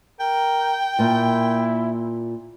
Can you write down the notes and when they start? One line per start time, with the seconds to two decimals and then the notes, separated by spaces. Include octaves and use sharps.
0.20 A#4 G5
0.99 A#2 A#3 E4